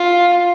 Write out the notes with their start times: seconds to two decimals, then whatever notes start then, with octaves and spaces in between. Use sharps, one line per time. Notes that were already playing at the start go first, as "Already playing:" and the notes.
Already playing: F4